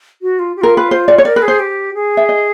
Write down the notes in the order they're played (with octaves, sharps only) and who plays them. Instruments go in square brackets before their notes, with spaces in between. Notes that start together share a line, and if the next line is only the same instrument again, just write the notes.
[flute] F#4
F4
G4
[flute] F4 [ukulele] A#4
[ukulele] B4
C5
D5
C#5
[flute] A#4 [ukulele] D5
[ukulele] B4
[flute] G#4
[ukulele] C5
[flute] G4
G#4
[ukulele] E5
D#5